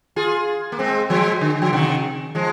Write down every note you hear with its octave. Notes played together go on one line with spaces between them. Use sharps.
F4 G#4
A#3
G#3 C4
F3 G#3
D3
F3
C3 D#3
F3 G#3